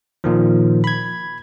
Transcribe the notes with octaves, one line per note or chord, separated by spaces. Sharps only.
A#2 D#3 F3
B5 G#6